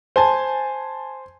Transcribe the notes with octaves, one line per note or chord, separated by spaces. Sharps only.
C5 G#5 A5